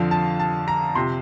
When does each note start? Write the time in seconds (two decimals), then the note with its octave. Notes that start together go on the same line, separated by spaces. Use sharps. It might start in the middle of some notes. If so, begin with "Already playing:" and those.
Already playing: F2 D3 F3 F5
0.11 A5
0.40 A5
0.68 A#5
0.95 F2 C3 F3 C6